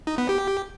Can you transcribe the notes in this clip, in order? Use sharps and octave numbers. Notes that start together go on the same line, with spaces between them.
D#4
B3
G4